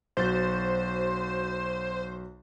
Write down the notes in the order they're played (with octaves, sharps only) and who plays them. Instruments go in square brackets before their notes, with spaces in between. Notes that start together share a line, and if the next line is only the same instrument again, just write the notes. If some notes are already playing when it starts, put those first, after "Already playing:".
[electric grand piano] B1 F#4 A6 [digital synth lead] C5